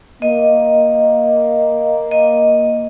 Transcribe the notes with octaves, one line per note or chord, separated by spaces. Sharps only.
A#3 D#5
D#5